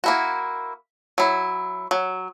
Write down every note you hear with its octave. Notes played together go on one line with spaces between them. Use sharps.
A#3 E4 F#4
F#3 E4
F#3